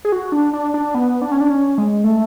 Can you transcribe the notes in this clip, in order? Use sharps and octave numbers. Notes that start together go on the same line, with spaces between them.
G#4
F#4
D4
D4
D4
B3
D4
C#4
D4
C#4
G#3
A3